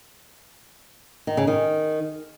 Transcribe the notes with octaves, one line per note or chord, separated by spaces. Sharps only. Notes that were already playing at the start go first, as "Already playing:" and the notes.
D#3
C#3
D#3